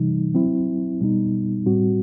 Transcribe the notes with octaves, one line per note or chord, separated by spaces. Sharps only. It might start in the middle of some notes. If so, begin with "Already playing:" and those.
Already playing: C3 E3 G3 D#4
F#3 C4 E4
B2 G3 B3 D#4
A2 G3 C4 F#4